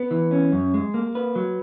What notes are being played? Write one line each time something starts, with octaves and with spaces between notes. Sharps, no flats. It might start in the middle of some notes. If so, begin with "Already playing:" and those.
Already playing: B3
E3
C#4
F#2
G#3
A#3
B4
F#3